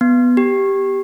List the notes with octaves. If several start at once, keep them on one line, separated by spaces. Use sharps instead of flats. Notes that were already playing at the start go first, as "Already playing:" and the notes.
B3
G4